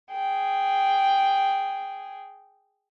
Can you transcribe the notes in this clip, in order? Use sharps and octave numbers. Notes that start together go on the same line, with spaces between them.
G#4 G5